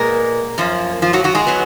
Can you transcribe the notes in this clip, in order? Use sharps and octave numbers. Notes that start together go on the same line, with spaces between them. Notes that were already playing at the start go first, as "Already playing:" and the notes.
Already playing: A#2 G#3 A#3 B3 A#4
F#2 F3 A#3
F3 F4
F#3 F#4
F#3 F#4
G#3 G#4
F#3 B3